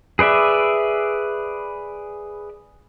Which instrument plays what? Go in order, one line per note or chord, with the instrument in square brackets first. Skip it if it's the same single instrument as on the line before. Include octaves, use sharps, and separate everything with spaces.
[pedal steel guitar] G#4 B4 D5 E5